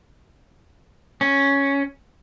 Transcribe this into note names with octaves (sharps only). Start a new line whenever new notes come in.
C#4